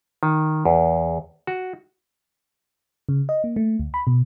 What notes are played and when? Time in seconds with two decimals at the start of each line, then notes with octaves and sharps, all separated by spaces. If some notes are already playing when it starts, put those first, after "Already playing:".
0.23 D#3
0.65 E2
1.47 F#4
3.09 C#3
3.29 D#5
3.44 A#3
3.56 A3
3.79 D2
3.94 B5
4.07 B2